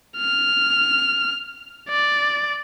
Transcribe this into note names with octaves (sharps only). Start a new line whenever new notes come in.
F6
D5